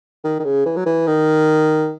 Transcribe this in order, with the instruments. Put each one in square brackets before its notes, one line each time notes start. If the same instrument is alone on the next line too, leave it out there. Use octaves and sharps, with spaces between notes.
[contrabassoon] D#3
D#3
C#3
E3
F#3
E3
D#3